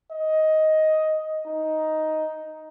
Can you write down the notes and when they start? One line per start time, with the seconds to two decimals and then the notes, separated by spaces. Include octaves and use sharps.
0.12 D#5
1.47 D#4